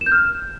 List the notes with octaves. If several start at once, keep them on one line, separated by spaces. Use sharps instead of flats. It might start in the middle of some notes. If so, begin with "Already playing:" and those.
E7
G6
F6